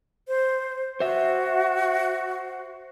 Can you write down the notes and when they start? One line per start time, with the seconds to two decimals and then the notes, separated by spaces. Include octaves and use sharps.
0.28 C5
1.00 F#4 C5 E5